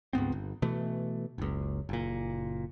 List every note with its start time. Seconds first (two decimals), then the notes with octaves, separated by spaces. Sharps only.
0.13 C#2 G2 B3 C4
0.32 G1
0.62 B2 E3 A3
1.38 F#1 C#2
1.89 F#1 A#2